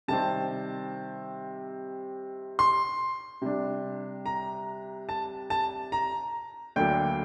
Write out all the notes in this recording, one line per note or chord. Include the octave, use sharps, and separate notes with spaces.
C3 D#3 G3 C4 A5
C6
C3 G3 D4
A#5
A5
A5
A#5
D2 D3 F#3 A#3 G5